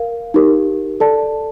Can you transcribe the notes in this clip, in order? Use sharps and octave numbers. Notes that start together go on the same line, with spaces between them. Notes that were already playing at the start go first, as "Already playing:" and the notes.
Already playing: A#4 F5
D#4 G4 A#4
A4 D5 A5